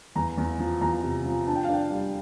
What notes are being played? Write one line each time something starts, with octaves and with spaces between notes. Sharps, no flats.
E2 A#5
E2
F3
E2 A#5
C3
F3
D4 A5
G5
F5
D4 G5
G3